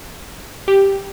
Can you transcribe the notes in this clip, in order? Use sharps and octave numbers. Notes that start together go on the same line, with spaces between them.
G4